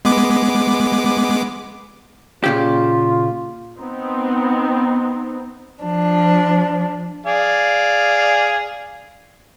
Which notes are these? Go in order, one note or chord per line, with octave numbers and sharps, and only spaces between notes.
G#3 B3 D6
A#2 C#3 F4 G4
B3 C4 D#4
F3 D4
G#4 D5 F5